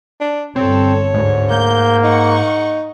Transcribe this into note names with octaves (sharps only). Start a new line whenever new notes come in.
D4
G1 C4 A4 C#5
D2 G#2
A#3 G6
D#4 F#5 C#6